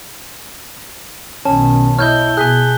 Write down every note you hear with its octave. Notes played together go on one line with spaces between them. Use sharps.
B1 D#3 C#4 A5
E4 C#5 D#5 F6 G6 G7
B2 G#4 G#5 F#6 B6 G7